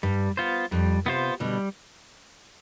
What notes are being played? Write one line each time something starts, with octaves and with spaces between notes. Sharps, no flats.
G2 G3
B3 F4 C5
F2 G3
C3 B3 F4 C5
B2 D3 G3